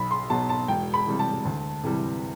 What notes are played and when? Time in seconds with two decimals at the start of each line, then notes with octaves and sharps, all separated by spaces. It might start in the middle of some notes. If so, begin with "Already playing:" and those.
Already playing: B1 B5
0.11 C6
0.30 B2 F#3 A5
0.49 A5
0.68 E1 G5
0.94 B5
1.06 E2 C3 G3
1.19 A5
1.45 D2
1.83 C3 E3 G3